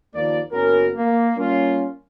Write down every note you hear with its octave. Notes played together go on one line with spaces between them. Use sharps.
D#2 F3 A#3 D5
F#1 B3 C#4 F#4 A#4
A#3
G3 A#3 C#4 F4